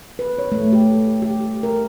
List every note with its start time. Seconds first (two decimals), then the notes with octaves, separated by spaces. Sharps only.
0.19 B4
0.38 C#5
0.52 A3
0.73 G4
1.22 G4
1.63 A#4